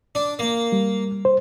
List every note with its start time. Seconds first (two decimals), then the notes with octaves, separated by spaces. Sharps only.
0.15 D4
0.39 A#3
0.72 G3
1.25 C5